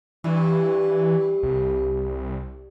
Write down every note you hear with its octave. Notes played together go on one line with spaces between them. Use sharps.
G2 E3
C2